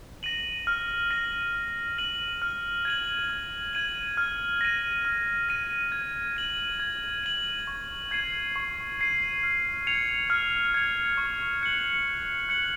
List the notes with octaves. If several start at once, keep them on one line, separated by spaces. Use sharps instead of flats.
A#6 D#7 F#7
F6
A#6 D#7 F#7
F6
A#6 D#7 F#7
F6
G#6 D#7 F#7
F6
G#6 D#7 F#7
F6
A#6 D#7
F6
A#6 D#7
G#6
D#7 F#7
G#6
D#7 F#7
C#6
G#6 C7 D#7
C#6
G#6 C7 D#7
F6
G#6 C#7 F7
F6
G#6 C#7 F7
C#6
F#6 C#7 F#7
C#6
F#6 C#7 F#7